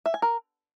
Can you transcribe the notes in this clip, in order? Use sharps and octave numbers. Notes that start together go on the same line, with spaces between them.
E5
G#5
A#4